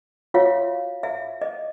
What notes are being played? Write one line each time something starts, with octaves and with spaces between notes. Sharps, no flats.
F4 F#4 C#5 E5 F5
E5 F5
D#5